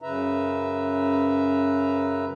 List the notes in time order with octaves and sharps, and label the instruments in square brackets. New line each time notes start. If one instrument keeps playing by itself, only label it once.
[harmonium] F#2 C#3 B4 E5 A#5